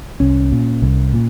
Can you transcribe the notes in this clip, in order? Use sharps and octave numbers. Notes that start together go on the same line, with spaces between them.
C2 C#4
A#2
C2
A#2